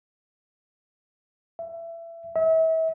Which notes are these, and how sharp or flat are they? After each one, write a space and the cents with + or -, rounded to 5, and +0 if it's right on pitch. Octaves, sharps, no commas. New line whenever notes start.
E5 +25
E5 -35